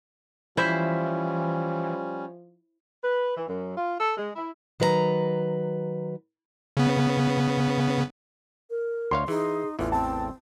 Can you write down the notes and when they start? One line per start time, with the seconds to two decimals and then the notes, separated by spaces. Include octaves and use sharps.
0.57 E3 F3 G3 C#4 E4 C5 E5
3.03 B4
3.36 E3
3.48 F#2
3.76 F4
3.99 A4
4.16 G#3
4.36 E4
4.80 D#3 F#3 B4 D#5 A#5
6.77 C#3 B3
8.70 A#4
9.11 D2 C#5 F5 C6
9.28 E3 D#4 G#4
9.79 A1 E2 E3 F4
9.92 C4 G5 A5